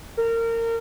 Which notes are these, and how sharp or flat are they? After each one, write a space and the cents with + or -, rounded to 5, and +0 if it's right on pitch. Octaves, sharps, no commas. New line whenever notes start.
A#4 -25